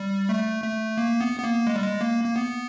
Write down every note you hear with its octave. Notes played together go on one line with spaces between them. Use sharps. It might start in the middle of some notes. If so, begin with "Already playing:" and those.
Already playing: G3
A3
A3
A#3
B3
B3
A#3
G#3
G3
G#3
A#3
A#3
B3